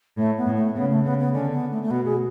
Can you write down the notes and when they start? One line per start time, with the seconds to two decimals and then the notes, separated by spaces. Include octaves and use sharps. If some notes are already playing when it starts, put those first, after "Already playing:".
0.17 A2 A3
0.37 B3
0.46 A2
0.56 A3
0.75 C#3 B3
0.90 A3
1.04 C#3 B3
1.18 B3
1.33 D3 C#4
1.52 B3
1.71 A3
1.82 A3
1.90 B2 B3
2.05 G#4